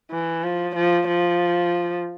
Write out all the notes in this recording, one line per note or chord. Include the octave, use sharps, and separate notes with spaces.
E3
F3
F3
F3